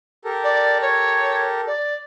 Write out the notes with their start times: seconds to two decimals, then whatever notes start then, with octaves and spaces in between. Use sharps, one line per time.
0.25 G4 A4 A#4
0.44 D5
0.82 C#5
1.67 D5